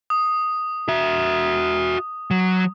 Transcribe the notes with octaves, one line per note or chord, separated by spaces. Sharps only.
D#6
F#4 E5
F#3